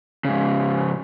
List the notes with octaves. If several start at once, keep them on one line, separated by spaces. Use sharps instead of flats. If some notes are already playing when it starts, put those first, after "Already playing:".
G#2 C#3